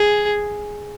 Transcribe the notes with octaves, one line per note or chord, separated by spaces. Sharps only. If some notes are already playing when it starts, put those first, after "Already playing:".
Already playing: G#4